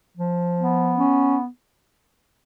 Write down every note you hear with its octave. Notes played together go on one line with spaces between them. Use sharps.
F3
B3
C#4